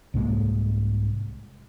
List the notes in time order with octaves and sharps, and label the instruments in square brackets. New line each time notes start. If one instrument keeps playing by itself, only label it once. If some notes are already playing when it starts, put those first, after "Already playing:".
[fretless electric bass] C2 G#2 G#3 A#3